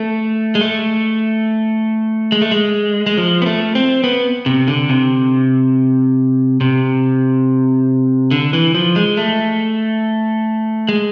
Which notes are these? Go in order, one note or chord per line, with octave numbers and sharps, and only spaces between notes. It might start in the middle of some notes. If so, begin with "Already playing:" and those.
Already playing: A3
G#3
A3
G#3
A3
G#3
G#3
F3
B3
A3
C4
B3
C3
D3
C3
C3
D3
E3
F3
G#3
A3
G#3